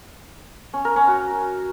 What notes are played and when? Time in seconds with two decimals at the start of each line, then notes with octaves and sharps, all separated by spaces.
0.73 C#4
0.85 A#4
0.96 C#4
1.07 F#4